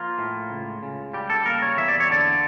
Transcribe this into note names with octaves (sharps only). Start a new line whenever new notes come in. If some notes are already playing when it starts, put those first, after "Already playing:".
Already playing: F3 A#3 F4
A2
C#2
C#3
G3 G4
A4
A#3 A#4
C#5
E2 E5
D5
C#5
D3 D5